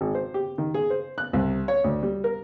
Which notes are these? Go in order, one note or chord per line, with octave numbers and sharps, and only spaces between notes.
G#1
C5
G4
D#3
G#4
C5
F#6
C2
C#5
D2
G3
A#4